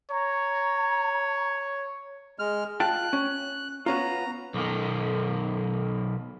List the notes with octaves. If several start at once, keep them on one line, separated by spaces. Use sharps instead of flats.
C#5 A#5
G#3 F6
F4 G5 A5 F#6
C#4
B3 C#4 F4 A#5
B1 D#3